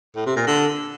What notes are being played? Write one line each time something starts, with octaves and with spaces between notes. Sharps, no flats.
A2
C3
A#2
D3